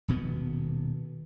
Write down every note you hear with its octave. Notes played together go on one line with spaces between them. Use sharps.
D#1 B2 D#3 B3